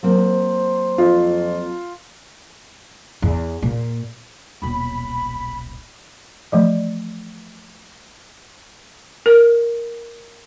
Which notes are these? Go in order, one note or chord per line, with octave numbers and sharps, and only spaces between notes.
F#3 A#3 C4 C5
F2 F4
E2
A#2
D#1 B1 B5
E3 F3 A3 D5
A#4